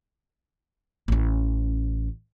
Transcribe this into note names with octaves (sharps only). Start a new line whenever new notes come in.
A1 C#4